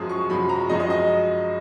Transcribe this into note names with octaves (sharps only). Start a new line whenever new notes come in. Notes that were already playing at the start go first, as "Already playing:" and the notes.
Already playing: F#2 F3 G#3 D#6
C#6
F#2 F3 G#3 B5
A#5
F#2 F3 G#3 D#5
D#5
D#5